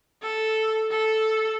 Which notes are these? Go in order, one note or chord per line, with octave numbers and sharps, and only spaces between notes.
A4
A4